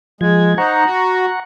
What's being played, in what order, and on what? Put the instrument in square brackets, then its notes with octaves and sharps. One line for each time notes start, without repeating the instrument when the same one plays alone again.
[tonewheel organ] F3 G#6 [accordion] G#3
[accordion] D#4 C5 [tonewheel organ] F#5 A#5 C#6
[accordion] F#4